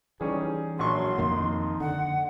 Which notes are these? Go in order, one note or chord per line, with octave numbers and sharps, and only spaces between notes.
E3 G3 C#4 D#4 G#4
A#1 F#3 C6 C#6
F2 D#3 A#3 D#4
D3 F#5